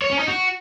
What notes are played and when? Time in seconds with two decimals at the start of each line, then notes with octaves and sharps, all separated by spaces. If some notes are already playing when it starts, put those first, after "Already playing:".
0.02 C#5
0.10 C#4
0.19 D#4
0.28 F#4